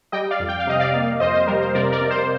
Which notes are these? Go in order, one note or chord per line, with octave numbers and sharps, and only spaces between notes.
G3 D#5 G5
D5 F5
F2
G5
F5
C3 D#5
D5 F5
A#3
F2 C5 D#5
C5
G3 A#4
C5
C3 A#4 D5
A#4 D5
C3
C5